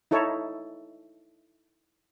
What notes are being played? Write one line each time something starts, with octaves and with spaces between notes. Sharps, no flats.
D#4 E4 A4 C#5